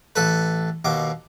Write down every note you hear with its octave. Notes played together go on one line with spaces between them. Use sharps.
A1 A4 B4
D#2 B2 D6